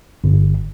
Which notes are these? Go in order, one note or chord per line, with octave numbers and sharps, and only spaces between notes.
G1